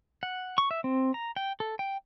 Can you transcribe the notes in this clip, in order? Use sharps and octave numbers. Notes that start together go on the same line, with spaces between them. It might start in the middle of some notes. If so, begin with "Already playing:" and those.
F#5
C#6
E5
C4
A#5
G5
A4
G5